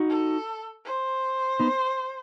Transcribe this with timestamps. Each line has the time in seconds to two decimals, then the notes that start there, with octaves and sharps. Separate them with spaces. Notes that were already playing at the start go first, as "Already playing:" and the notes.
Already playing: D#4 F#4
0.09 A4
0.85 C5
1.60 B3 D#4